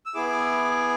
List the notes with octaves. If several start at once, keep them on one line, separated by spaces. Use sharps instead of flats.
E6
B3 E4 G#4 D6